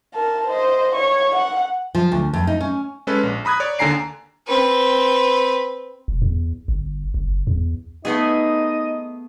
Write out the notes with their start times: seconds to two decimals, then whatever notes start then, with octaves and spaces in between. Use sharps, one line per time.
0.14 A#4 A5
0.47 C5 D#5
0.95 C#5 C#6
1.36 F#5
1.95 F3
2.12 D2
2.33 F2
2.47 D#4
2.61 C#4
3.07 G#3 C#4 A4 B4
3.23 A#1
3.45 A#5 B5 D#6 F#6 G#6
3.60 C#5 D5
3.79 D#2 D3 G#5 A#5 C7 D7
4.48 C4 B4
6.08 E1
6.22 E2
6.68 G1
7.14 F#1
7.47 E2
8.05 A3 B3 D#4 G#4 D#5